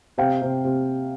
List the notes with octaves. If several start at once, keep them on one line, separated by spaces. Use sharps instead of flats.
C3 F5 G5
C3
C3